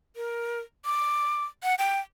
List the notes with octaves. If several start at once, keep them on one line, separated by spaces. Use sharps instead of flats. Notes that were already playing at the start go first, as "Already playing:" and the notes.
A#4
D6
F#5
G5